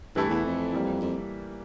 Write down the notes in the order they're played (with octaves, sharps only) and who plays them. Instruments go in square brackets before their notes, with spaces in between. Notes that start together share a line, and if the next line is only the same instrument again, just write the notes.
[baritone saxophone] G2 [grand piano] E3 A3 E4 A4
[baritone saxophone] E2
F2
[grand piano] E3 G3 A#3
[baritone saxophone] F2